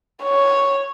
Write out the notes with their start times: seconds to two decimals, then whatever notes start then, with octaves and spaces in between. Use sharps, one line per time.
0.24 C#5